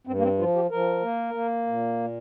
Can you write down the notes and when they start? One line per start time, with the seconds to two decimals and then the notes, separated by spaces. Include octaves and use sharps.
0.07 G2 C4
0.18 A#3
0.23 C4
0.38 F3 F4
0.56 G4
0.71 F3 A#4
1.02 A#3
1.34 A#3
1.67 A#2